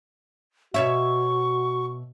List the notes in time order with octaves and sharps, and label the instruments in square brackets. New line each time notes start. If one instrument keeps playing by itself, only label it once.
[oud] B2 C#5 E5 [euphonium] F#4 [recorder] C#6